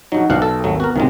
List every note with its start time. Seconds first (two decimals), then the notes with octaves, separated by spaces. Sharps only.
0.12 A#1 F#3 D#4 F#4
0.30 B1 D4 F5 F#5
0.42 A4
0.64 G#1 D#2 F#3 A3
0.80 B3 F#4 A#4
0.96 B1 A2 C3 D#3 F#3 G#3